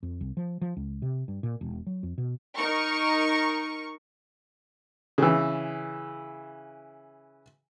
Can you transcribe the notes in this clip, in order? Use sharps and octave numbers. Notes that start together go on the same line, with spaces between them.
F2
C2
F3
F3
C#2
C3
G2
A#2
E1
F#3
F2
B2
D#4 A#4 C#6
C#3 E3